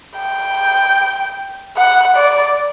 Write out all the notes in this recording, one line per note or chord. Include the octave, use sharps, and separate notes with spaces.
G5
F#5
D5